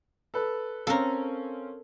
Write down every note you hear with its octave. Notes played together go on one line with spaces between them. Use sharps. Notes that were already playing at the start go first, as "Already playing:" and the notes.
A4 B4
C4 C#4 A4 A#4 F5